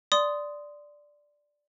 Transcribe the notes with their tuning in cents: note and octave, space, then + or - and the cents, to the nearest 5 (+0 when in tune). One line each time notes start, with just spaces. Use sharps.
D5 +0 C6 -15 D#6 +0